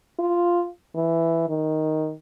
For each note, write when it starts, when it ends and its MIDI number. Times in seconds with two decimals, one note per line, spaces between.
0.19 0.66 65
0.95 1.44 52
1.48 2.13 51